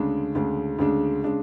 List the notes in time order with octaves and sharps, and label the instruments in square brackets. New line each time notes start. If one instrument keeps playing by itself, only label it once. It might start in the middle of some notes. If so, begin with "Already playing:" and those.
Already playing: [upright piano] D2 C#3 G#3 D4
D2 C#3 G#3 D4
D2 C#3 G#3 D4
C#3 G#3 D4